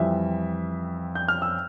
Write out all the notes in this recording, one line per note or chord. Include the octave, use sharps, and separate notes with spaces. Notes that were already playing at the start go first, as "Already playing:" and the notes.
Already playing: F2 E3 G3 E5
G6
F6
E6